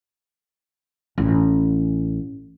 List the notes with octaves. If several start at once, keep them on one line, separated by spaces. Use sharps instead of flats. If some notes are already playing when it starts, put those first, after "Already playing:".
A1